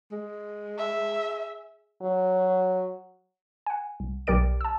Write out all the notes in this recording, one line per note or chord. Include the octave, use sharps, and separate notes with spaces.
G#3
G#4 E5
F#3
F#5 G#5
C2
B1 G4 A#4 D5 D7
A5 E6